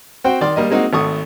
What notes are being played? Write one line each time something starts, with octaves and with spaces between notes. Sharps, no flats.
C4 F#4 C5 G5
D#3 D5 C6 D6
G3 A#3 D#5
G#3 A#3 C4 D#4 F#4
G#1 A3 C#6 D#6